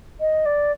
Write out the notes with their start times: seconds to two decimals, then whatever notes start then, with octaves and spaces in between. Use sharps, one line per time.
0.20 D#5
0.45 D5